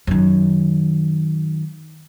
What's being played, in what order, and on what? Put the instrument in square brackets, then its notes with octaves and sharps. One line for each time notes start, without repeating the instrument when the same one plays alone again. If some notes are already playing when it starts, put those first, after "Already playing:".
[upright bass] F#2 D#3